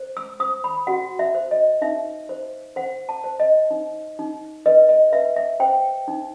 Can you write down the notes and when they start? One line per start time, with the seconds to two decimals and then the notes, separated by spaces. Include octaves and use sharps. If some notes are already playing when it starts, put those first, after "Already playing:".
Already playing: C5
0.17 E6
0.40 C5 D#6
0.64 B5
0.87 F#4 F#5
1.19 E5
1.35 C5
1.51 D#5
1.82 D#4 E5
2.29 C5
2.76 C5 F#5
3.09 A5
3.24 C5
3.40 D#5
3.71 D#4
4.19 D#4
4.66 B4 D#5
4.89 D#5
5.12 B4 E5
5.36 E5
5.60 C5 G5
6.08 D#4